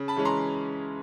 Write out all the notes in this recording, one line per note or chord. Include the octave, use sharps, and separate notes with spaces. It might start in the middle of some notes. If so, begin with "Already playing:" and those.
Already playing: C#3
A5 B5
E3 G#3 C#4
A#5 C6